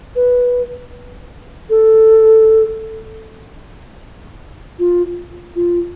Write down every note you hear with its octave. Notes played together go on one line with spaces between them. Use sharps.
B4
A4
F4
F4